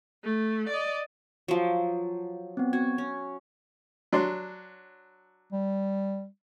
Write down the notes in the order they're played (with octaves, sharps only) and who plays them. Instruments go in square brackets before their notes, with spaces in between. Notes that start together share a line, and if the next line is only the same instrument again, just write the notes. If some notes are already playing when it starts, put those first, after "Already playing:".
[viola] A3
D5 D#5
[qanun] F3 F#3
[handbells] B3 C4
[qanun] F#4 [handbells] G#6
[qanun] C#4
[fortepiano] F#3 D4 C6
[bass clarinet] G3